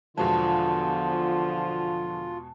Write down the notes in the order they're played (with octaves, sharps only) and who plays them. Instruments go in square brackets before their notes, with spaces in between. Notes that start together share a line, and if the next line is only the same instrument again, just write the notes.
[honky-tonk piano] E2 B2 G#3 [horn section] D3 F3 [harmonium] F4 [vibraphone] A5